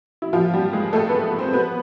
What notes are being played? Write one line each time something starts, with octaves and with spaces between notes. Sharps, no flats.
E4
F3 F4
G3 G4
G#3 G#4
A3 A4
B3 B4
C4 C5
B3 B4